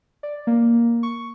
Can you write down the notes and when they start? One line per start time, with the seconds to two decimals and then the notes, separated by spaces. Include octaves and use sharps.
0.23 D5
0.47 A#3
1.03 C#6